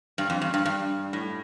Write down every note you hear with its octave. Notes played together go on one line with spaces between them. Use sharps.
G2
F2
G2
G2
G2
A2